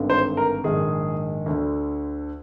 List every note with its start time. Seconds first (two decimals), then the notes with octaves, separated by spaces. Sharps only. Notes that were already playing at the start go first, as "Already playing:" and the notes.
Already playing: G#1 G2 D3
0.10 C5
0.37 A#4
0.64 A#1 G#2 D#3 G#4
1.46 D2 D3